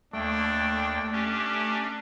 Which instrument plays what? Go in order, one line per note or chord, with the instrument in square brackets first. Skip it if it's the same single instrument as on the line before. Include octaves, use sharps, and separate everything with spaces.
[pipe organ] D#2 G5 [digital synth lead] A3 [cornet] D4
[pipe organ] C#4 G4 [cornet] D4